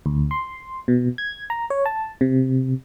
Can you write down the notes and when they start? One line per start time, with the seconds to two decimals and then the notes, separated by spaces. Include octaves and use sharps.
0.06 D2
0.31 C6
0.88 B2
1.18 G#6
1.50 A#5
1.70 C#5
1.86 A5
2.21 C3